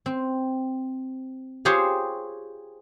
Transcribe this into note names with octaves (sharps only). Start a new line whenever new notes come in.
C4
F4 G4 G#4 C5 C#5